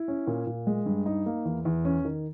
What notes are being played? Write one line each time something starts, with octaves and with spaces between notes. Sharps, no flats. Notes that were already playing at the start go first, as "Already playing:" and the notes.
Already playing: E4
C#4
A#2
A#2
G#3
G2
D#4
A#3
E2
E2
C#4
D#3